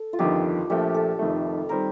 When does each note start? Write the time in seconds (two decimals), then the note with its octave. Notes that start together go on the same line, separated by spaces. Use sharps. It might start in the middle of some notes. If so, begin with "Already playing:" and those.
Already playing: A4
0.13 F4
0.19 G1 F2 D#3 G4
0.70 A#1 A#2 F3 A3 G4
0.94 A4
1.19 F1 F2 D#3 A3
1.69 D#3 G3 C4 A#4